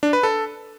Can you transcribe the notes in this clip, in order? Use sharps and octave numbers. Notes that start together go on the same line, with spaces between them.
D4
B4
A4